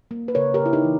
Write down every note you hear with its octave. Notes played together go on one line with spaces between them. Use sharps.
A#3
B4
C#3 A#4 C#5
G4 A#4
C#3
E4
D#4 G4
E3